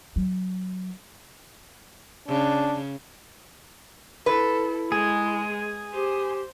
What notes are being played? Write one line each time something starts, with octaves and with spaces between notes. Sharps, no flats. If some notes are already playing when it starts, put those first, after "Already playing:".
F#3
C#3 D4
E4 A4 B4
G#3 G#4
G4 C5